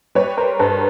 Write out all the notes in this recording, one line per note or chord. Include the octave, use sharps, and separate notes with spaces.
G3 B4 C#5
A#4 C5
G2 A4 B4